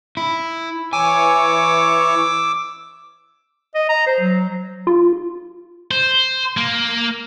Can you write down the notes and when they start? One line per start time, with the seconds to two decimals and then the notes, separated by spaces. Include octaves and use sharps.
0.17 E4
0.93 E3 C#5 G#5 D6 E6
3.75 D#5
3.89 A#5
4.07 C5
4.20 F#3
4.87 F4
5.91 C5
6.57 A#3